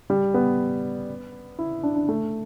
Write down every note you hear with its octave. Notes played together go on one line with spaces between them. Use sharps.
G3
B3
E4
D4
D4
A3